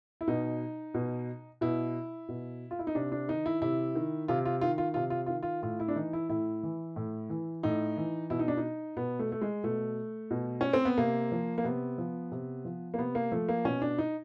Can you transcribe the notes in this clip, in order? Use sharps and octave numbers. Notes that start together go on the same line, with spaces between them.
E4
B2 D#4
B2
B2 E4
B2
F4
E4
D#4
C3 D4
D4
D#3 D#4
E4
C3 E4
D#3
C3 F4
F4
D#3 F4
F4
C3 F4
F4
D#3 F4
F4
A2 F4
E4
D4
E3 D#4
E4
A2 E4
E3
A2
E3
A2 D#4
E3
B2 E4
D#4
D4
D#4
B2 B3
A3
A3
G#3
B2 A3
B2
C#4
C4
B3
C3 A#3
F3
A#3
C3 B3
F3
C3
F3
A#3
C3 B3
A#3
F3 A3
A#3
B2 C#4
D4
D#4